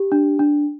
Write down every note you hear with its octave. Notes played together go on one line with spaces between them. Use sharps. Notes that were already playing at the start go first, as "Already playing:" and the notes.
Already playing: G4
D4
D4